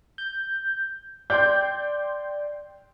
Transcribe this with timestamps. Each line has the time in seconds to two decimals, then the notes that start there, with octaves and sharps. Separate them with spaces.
0.18 G6
1.30 D5 G5 C6 G6